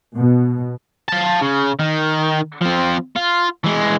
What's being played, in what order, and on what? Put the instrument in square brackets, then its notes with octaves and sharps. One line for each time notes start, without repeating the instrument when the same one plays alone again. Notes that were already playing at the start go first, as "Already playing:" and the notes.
[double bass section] B2
[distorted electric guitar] F5 A5
C#3
D#3
F3 C4
F4
E3 G#3